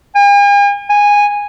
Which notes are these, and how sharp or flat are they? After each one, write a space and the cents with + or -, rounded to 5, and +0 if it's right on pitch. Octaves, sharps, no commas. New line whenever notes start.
G#5 -45
G#5 -10